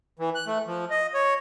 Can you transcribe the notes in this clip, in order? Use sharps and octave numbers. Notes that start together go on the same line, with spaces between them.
E3
F#6
A3
F3
D#5
C#5